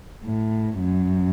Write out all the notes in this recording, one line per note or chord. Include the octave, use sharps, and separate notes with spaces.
A2
F#2